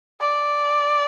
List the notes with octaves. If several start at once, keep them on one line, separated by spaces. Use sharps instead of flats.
D5